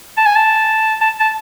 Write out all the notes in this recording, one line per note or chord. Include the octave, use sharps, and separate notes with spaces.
A5
G#5
A5
A5
A5